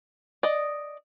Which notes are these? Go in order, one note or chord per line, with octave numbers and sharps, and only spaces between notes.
D5 D#5